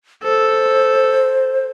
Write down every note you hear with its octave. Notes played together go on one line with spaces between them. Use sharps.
A4 C5